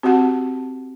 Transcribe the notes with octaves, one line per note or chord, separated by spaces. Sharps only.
C4 F#4 G4 F#5 A5